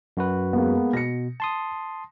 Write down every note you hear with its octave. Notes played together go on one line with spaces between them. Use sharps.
F#2 F#4 B4
G#3 A#3 B3
B2 A#6 C#7
A5 C6 D#6